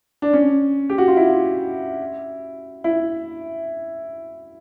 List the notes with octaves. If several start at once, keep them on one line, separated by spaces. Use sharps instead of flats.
D4
C#4
G4
F#4
F4
E4
E4